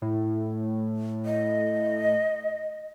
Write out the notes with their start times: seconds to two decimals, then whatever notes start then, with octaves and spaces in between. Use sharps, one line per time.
0.02 A2
1.25 D#5